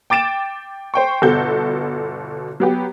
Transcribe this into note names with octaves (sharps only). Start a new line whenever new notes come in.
G5 D6 A6 D7 E7
C5 G5 C#6
G1 B2 F#4 A4 G6
F#3 B3 G4